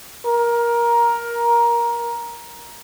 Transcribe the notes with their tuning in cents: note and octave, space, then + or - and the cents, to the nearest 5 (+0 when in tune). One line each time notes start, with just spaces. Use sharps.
A#4 +15